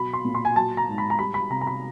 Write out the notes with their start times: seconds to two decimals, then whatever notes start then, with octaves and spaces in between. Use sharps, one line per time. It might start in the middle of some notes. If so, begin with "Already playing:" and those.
Already playing: B2 F#3 B5
0.14 C6
0.25 A#2
0.35 C6
0.45 G#5
0.56 F#3 A5
0.77 A#5
0.88 G#2
0.98 B5
1.10 A#5
1.19 G3 B5
1.34 B5
1.50 C3 A#5
1.61 A#5
1.67 B5